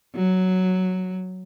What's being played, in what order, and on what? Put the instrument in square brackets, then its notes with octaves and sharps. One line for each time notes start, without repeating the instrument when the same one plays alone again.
[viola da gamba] F#3